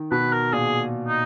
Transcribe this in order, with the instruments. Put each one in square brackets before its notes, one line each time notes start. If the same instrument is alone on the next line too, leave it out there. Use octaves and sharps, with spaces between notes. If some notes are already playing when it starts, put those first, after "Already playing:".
Already playing: [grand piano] D#3
[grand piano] B2 [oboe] B4
[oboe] A#4
[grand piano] A#2 [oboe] G#4
[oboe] D#4